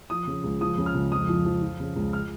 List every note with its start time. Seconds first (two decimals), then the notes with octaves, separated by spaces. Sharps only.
0.10 F3 D#6
0.27 C#3
0.44 C#2
0.61 F3 D#6
0.78 C#3
0.86 F6
0.95 C#2
1.12 F2 D#6
1.28 F3
1.45 F3
1.62 F3
1.80 C#3
1.96 C#2
2.13 F6